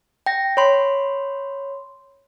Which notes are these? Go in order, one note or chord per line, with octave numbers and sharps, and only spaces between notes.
G5 A#6
C#5 B5 C6